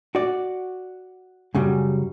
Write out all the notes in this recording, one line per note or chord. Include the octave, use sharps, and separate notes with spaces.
F#4 D5
F#2 C#3 G3